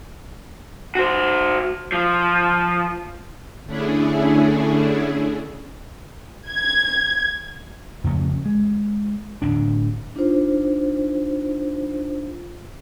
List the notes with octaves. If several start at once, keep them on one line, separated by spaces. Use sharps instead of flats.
F#4 C5
F3
D3 A3 C#4 D4 E4 G#4
G#6
F2 C#3 A3 C#4
G#3
D1 D2 D4
D4 D#4 F4 C5